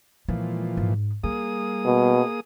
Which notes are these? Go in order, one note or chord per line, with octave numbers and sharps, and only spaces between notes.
A#2 E3 F3 G#3
G#2
G3 A#3 G#4 D#6
B2